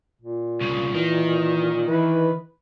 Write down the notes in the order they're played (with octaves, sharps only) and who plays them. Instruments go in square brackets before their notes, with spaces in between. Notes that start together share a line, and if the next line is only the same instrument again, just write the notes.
[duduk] A#2
[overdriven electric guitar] C2 C#3
[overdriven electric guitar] D#3 [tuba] E3
[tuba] E3 [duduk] B4